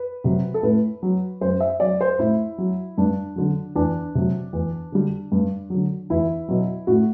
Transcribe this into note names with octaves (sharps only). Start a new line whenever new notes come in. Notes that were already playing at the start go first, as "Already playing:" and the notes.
Already playing: B4
C3 F#3
A4
A2 B4
F#3
F#2 C5
E5
F#3 D5
C5
A2 E4
F#3
G2 D4
D3 F#3
E2 D4
C3 F#3
E2
D3 G3
G2
D3 F#3
E2 E4
B2 F#3
A2 F#4